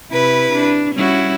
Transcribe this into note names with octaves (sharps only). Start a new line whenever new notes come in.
C3 E4 B4
D4
G3 C#4 E4 F#4